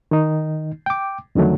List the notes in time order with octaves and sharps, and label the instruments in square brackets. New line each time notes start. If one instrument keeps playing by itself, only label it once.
[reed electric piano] D#3 D#4
G5 D6
F2 D3 D#3 F#3 A3